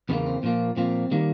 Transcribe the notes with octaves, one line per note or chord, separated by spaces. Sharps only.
E2 C#3 E3 G3 A#3 B3
C4
A#2 F3 A#3
A#2 F3 A#3 C4
D#3 G3 A#3